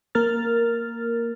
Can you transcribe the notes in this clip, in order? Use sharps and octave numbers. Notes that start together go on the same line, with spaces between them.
A#3 A#4 F6 A6